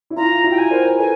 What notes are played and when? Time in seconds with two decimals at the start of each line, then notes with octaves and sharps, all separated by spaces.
0.10 E4
0.17 F4 A#5
0.44 E4 F#4
0.51 G5
0.58 G#5
0.71 A#4 C5
0.99 A4 B4 G#5